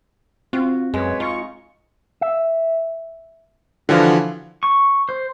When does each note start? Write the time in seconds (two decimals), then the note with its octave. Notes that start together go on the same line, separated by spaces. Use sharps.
0.53 C4 F4 F#4
0.94 F#2 G#3 B4 C#5
1.20 D#4 F4 C#6
2.21 E5
3.89 D3 E3 F3 F#4 F5
4.63 C#6
5.09 C5